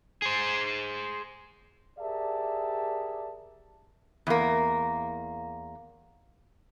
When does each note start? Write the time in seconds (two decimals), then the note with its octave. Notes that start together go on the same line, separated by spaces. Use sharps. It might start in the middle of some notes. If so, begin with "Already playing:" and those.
0.22 G#4 C5
1.99 G4 G#4 A#4 D5 E5 A5
4.27 E2 A#3